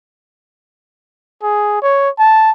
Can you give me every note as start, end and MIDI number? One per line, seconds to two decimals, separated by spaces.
1.43 1.81 68
1.82 2.09 73
2.19 2.51 81